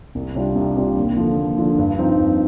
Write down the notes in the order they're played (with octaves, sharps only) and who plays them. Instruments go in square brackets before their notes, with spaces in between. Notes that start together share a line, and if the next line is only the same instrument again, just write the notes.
[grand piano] C2
C3 G3 D4 F4
C2
C3 G3 D4 F4
D#2
D3 F3
D#2
D3 F3
G2
F3 C4 D#4
G2